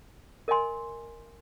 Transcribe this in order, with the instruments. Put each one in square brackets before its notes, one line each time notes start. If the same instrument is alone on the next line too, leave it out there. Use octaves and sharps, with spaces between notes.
[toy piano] A#4 D#5 G#5 C6